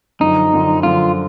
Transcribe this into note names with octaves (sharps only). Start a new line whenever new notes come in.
F#2 D3 F3 D#4
F#2 D3 F3
F#2 D3 F3 F4